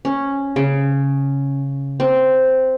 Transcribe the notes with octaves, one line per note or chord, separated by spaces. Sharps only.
C#4
C#3
C4